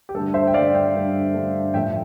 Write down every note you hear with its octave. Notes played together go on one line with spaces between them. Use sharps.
G4
G2 D3 A3 A4
C5 E5
G5
G2 D3 A3 D5 F5
E5 G5
G2 D3 A3
G2 D3 A3
A2 F3 A3 E5 G5